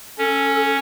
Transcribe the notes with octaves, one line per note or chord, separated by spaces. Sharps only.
C#4 A4